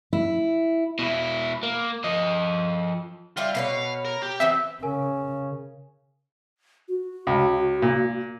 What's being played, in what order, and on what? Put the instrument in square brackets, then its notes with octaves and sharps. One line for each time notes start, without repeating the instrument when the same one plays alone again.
[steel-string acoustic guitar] E4
[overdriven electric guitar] B2 E4
A#3
F3 D#5
[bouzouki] G3 E4 D5 [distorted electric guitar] F4
[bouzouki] B2 B4 C#5 [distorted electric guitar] F5
[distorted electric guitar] A#4
G4
[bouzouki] E3 B3 C4 [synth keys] E5
[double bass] C#3 [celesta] A#4 G#5
[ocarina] F#4
[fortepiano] C#2
A#2